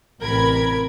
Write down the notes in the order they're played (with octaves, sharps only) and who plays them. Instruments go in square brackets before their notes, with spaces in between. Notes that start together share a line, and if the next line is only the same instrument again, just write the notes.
[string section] A1 C3 A#4 B5 G#6